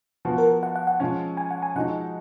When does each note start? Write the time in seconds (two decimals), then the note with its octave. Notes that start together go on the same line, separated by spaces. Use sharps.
0.25 F3 B3 F#4
0.38 A#4
0.63 F#5
0.76 F#5
0.87 F#5
1.00 F3 G#3 C#4 F#5
1.37 G#5
1.51 F#5
1.62 G#5
1.76 F3 G#3 D#4 F#4 F#5